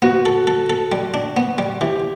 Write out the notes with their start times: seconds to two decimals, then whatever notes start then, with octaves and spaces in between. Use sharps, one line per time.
0.02 B3 F#4
0.26 A4
0.47 A4
0.70 A4
0.92 G3
1.14 D4
1.37 B3
1.58 G3
1.81 E3 G4